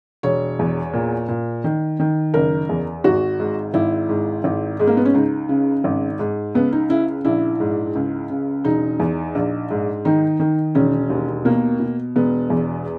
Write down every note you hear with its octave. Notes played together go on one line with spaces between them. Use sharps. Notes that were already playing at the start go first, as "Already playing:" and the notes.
E1 C#5
E2
A#2
A#2
D#3
D#3
F#1 A#4
E2
G#1 F#4
G#2
G#1 E4
G#2
G#1
G#2 G#3
A#3
B3
C#4
C#2 D#4
C#3
G#1
G#2
C#2 B3
D#4
C#3 E4
A#1 E4
G#2
C#2
C#3
E1 D#4
E2
A#1
G#2
D#3 D#4
D#3
E1 C#4
D#2
B2 A#3
B2
E1 B3
E2